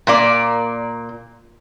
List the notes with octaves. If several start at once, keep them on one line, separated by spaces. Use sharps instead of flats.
A#2 A#3 D5